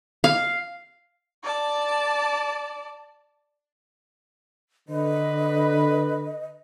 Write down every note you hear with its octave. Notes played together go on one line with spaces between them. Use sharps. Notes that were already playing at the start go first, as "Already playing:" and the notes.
F5
D5 A5
D3 B4 D#5